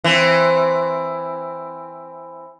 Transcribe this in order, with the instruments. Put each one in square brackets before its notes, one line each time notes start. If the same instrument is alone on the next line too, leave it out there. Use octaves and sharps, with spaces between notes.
[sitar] E3 C4